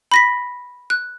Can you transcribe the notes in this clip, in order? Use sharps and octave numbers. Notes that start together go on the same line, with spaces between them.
B5 A#6 B6
F#6